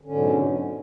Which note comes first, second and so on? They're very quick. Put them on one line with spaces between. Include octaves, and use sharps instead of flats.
D3 C#4 G#2 B2 F#3